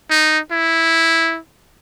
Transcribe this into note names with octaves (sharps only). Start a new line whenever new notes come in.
D#4
E4